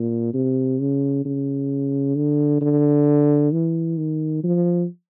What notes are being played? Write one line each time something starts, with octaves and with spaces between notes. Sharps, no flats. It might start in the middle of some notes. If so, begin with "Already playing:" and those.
Already playing: A#2
C3
C#3
C#3
D3
D3
E3
D#3
F3